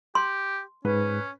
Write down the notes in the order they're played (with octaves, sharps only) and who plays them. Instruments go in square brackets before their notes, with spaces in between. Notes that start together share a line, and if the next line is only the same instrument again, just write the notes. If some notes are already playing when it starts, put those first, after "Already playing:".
[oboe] G4 [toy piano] C6
[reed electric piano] G#2 [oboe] C#4 [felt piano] B4